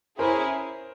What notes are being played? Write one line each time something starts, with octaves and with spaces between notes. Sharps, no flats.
C#4 E4 G#4 A#4 C5